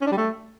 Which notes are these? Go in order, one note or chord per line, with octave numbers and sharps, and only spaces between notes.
C#4
D4
G3
A3